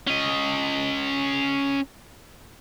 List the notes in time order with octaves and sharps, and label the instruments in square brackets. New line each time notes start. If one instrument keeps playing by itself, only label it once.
[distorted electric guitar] C#4 D#5